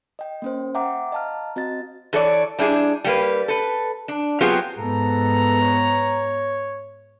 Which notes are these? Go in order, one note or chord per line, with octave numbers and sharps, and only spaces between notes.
D#5 G5
A#3 C#4 C5
E5 F#5 G5 A#5 D6
D#5 F5 A5 A#5 F6
C4 F#4 D#5 A6
E3 A4 C#5 D5
G3 D4 E4 G#4
G3 A#3 B4
A4 B4
D4
F#3 B3 C4 F4 G4 G#4
G#2 B3 A4 A#5
C#5